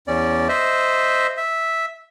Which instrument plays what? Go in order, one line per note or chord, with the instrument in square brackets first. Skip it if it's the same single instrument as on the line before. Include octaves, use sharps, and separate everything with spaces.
[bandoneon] E2 C#4 D5
C5 D#5 E5
E5